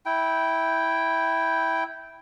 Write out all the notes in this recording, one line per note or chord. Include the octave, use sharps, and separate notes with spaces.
E4 G5